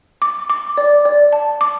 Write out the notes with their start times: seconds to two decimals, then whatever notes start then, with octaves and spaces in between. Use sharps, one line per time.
0.22 D6
0.50 D6
0.77 D5
1.05 D5
1.33 A5
1.61 D6